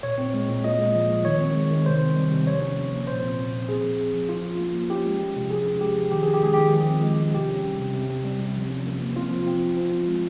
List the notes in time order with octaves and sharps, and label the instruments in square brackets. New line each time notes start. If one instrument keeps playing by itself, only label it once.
[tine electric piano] A#2 C#5
C4
G#3
A#2
A#2 D#5
G#3
F3
A#2
D#3 C#5
C4
G#3
D#3
C3 C5
C4
G3
C3
F3 C#5
C#4
A#3
F3
A#2 C5
C4
F3
A#2
C4 G#4
F3
C4
F3
F3 F4
C#4
A#3
F3
C#4 G4
G#3
F3
C3
F3 G#4
C#4
G#3 G4
F3
D#3 G4
C#4 G#4
G4
G#3 G#4
D#3 G4
F3
C4
G#3
F3
C3 G4
C#4
G3
C3
C3
C4
G3
C3
F3
C#4
A#3
F3
C4 F4
F3
C4
F3
F3
C4
G#3